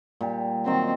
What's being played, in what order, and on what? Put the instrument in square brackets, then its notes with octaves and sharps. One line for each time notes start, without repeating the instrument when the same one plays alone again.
[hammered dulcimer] A#2 G3 G4
[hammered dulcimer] D#3 F#3 [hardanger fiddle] C4